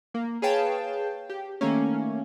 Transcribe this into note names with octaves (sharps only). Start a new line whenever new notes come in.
A#3
G#4 B4 C#5 F5 G5 A5
G4
D#3 A3 A#3 C#4